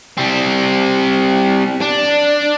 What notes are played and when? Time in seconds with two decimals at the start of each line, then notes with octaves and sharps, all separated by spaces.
0.18 G3 C4
1.81 D4